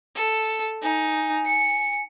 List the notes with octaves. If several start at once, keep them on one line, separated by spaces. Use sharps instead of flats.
A4
D#4 G#5
C#7